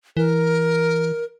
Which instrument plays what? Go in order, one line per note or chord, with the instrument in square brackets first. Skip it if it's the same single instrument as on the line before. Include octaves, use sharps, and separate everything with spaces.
[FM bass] E3 [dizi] A#4